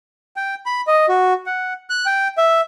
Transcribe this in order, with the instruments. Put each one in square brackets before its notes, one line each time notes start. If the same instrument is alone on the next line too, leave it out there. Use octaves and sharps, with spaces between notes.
[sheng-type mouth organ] G5
B5
D#5
F#4
F#5
F#6
G5
E5